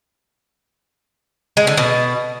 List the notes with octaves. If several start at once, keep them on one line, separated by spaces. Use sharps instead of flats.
G#3
D3
B2